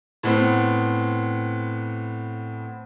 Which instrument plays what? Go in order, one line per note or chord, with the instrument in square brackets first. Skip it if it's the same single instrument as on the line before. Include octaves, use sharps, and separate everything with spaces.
[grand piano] A2 B3 C4